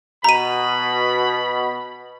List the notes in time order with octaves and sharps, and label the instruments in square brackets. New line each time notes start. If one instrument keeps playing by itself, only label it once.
[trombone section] B2 [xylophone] A#5 D#7 [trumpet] B5